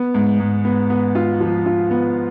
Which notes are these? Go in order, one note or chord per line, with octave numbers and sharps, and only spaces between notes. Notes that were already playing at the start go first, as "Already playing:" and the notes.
Already playing: B3
G#2
G#2
B3
B3
F4
F3
F4
B3